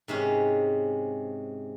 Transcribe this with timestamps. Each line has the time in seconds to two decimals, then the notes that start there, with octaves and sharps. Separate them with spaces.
0.08 G#2 C3 G#3 C#4